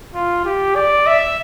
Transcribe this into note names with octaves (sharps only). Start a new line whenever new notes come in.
F4
G4
D5
E5